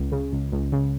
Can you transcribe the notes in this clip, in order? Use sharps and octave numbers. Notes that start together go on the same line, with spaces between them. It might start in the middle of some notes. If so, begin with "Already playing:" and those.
Already playing: C#2
C#3
C#2
C#2
C#3